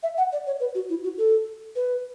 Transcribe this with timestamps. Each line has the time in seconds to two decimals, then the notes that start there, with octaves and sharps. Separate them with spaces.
0.03 E5
0.17 F#5
0.32 D5
0.46 C#5
0.60 B4
0.75 F#4
0.90 E4
1.04 F#4
1.18 A4
1.76 B4